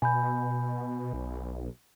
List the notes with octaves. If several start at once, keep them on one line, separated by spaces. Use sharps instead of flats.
B2 G#5 B5 G6
B1